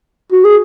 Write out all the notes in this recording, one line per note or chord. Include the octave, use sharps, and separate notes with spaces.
F#4
G#4